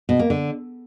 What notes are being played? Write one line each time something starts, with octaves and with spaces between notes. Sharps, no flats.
B2
A#3
D3